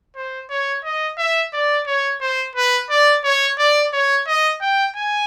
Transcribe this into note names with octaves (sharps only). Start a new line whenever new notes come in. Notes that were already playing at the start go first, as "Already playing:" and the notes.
C5
C#5
D#5
E5
D5
C#5
C5
B4
D5
C#5
D5
C#5
D#5
G5
G#5